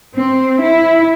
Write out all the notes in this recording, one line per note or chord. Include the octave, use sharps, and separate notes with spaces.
C4
E4